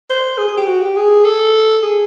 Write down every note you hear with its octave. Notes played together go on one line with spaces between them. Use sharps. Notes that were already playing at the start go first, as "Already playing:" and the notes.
C5
G#4
G#4
G4
F#4
G4
G#4
A4
G#4